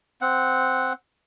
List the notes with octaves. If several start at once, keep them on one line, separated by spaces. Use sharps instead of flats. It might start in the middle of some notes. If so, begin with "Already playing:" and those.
C4 F#5